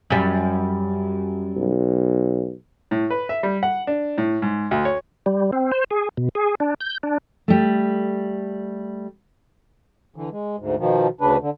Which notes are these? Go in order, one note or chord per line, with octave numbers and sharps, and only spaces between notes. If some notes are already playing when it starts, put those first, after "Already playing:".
F#2 G3
B1
A2
B4
E5
G3
F#5
D4
A2
G#2
D2
C#5
G3
C4
C5
G#4
B2
G#4
D4
G6
D4
G3 A3
D3 E3
G#3
D2 G#2
B2 D#3 F3
D2 C#3 D4 B4
D3